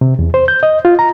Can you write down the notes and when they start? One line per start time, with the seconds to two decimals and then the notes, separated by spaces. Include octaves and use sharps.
0.01 C3
0.19 E2
0.34 C5
0.48 G6
0.63 D#5
0.85 F4
0.99 A#5